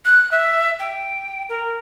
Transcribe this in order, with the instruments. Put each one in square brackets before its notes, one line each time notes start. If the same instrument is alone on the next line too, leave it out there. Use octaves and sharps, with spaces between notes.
[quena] F#6
E5
G5
A#4